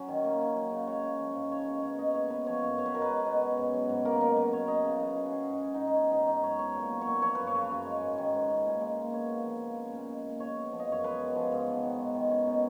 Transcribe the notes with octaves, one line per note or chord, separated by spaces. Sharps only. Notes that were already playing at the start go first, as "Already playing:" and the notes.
Already playing: F#3 C#4
D#3
A#3
C#4
F#3
C#3
G#3 C#5
C#4
F3
G#2
C#4 C#5
B2 C#5
A#3 C#5
B2 D#5
G#3 C#5
B3 B4
F3 C#5
F#2 C#5
B3 C#5
B4
B2 A#4
B4
G#3
B2
C#4
G#2
F#3
G#2
A#3 A#4
B2 A#4
F#3 B4
B2 C#5
C#4 D#5
C#3
F#3 B4
C#3 G#4
F#4
C#4 G#4
G#2 F#4
F#3
D#4
G#2
D#4
B3 C#4
G#2 D#4
F#3 D#4
G#2 C#5
B3 C#5
A#2
C#5
F#3
C#5
A#2
F3 C#5
F#2 B4
C#5
C#3
F#2
G#3
G#2
D#3
G#2
C#4
A#2
G#3
A#2
B3 C#5
C#3
F3
C#3
C#4
A#2
G#3
A#2
G#3 C#5
B3
F3
D#5
F#2 C#5
G#3 B4
B3
F3
G#2
B3
D#3
G#3
D#3
C#4
B2